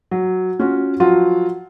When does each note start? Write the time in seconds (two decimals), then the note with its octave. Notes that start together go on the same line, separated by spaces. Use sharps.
0.11 F#3
0.60 C#4 F4 F#4
1.00 F3 F#3 F4 F#4